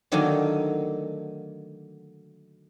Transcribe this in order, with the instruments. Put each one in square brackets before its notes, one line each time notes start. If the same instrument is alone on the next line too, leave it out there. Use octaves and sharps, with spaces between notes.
[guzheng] D3 D#3 F#3 A3 A#3 D#4